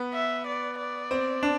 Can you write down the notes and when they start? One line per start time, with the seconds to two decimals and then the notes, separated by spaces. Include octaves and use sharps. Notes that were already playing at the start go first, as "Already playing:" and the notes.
Already playing: B3
0.14 E5
0.47 D5
0.78 D5
1.11 C4
1.43 D4